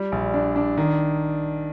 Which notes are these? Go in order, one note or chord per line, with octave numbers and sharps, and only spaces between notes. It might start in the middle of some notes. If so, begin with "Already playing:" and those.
Already playing: G3
A#1
D4
D4
D#3